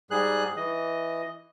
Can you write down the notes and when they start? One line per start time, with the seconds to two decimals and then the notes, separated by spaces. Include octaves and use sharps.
0.11 G#2 G3 G#4 F#6
0.57 E3 D#5